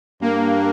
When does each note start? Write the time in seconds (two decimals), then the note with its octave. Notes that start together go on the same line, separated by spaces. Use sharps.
0.21 G2 A#3